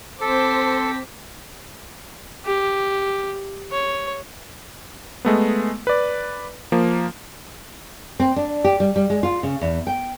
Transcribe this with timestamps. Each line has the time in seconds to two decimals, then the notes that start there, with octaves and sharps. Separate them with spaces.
0.21 C4 A4 C5 A5 C6 D6 B6
2.46 G4
3.72 C#5
5.25 G#3 A3 B3
5.87 B4 D5
6.72 F3 A#3
8.20 C4
8.36 D4
8.64 G4
8.80 G3
8.96 G3
9.10 G#3
9.23 F4
9.43 C#3
9.61 E2
9.87 G5